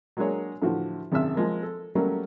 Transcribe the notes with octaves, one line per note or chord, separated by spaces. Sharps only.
F#3 G#3 A#3 D4 G#4 C#5
A2 D3 E3 F3 F#4
G#1 F#2 C3 E5 E6
F3 G#3 A#3
A4
F#3 G3 A3 A#3 C#4